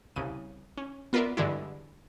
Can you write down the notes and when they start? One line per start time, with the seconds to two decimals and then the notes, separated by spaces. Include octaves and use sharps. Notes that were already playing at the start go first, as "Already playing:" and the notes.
0.16 C2 C#3 D#7
0.77 C#4
1.13 B3 F4 A#4 B4 D5 E5
1.37 G2 D3 E3 G#3 E4